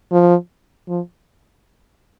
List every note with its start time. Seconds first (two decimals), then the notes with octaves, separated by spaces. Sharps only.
0.12 F3
0.88 F3